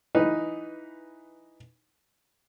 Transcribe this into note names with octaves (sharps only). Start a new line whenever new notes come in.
E3 D#4 B4